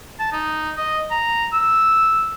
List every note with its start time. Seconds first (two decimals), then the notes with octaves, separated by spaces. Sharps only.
0.20 A5
0.32 D#4
0.77 D#5
1.11 A#5
1.53 E6